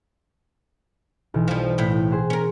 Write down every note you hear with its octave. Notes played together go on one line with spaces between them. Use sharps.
B1 E3
F3 G3
A2 E4 G5
G#4 C5 F#5
C#4 A#4